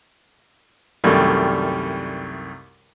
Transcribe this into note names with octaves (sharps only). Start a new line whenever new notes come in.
C2 F#2 D#3 G3 A3